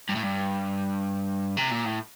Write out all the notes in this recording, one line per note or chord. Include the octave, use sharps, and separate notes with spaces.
G2
A2
G2
C3
A#2
A2